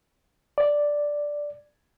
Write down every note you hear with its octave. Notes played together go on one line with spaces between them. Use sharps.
D5